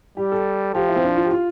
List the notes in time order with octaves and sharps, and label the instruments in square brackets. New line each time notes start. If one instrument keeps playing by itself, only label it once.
[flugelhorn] G3 [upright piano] G4
[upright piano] A4
[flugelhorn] F3 [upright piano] G4
[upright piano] E4
C4
D4
F4
G4
F4